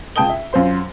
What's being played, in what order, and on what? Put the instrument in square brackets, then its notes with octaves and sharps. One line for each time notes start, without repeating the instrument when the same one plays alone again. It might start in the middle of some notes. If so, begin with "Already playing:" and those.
[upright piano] C#2 F4 G5 A5 D#6 G7
E5
F#2 F4 C5 C6